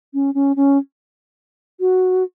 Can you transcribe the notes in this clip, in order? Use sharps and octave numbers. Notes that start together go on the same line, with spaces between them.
C#4
C#4
C#4
F#4